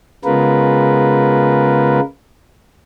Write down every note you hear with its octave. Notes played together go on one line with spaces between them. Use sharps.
C#3 G#3 B3 F4 A#4 B4